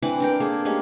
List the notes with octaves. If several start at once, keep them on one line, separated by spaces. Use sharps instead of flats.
E3 C4 D4 B4
D4 A#4 G5
A#3 G#4 A4
G3 G#3 A#3 C#4